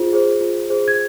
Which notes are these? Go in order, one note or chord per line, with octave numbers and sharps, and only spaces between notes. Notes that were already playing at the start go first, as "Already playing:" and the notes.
Already playing: F4 G#4 C5
G#4 C5
F4
G#4 C5
G#6